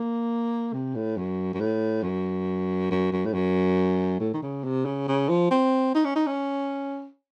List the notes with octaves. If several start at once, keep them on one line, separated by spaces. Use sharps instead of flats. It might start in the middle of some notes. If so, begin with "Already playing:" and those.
Already playing: A#3
C3
A2
F#2
F#2
A2
F#2
F#2
F#2
A2
F#2
A2
D#3
C#3
C3
C#3
C#3
F3
C4
D#4
C#4
D#4
C#4